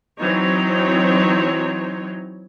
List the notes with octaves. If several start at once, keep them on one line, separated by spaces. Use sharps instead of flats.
E3 F#3 C4 D#4 C#5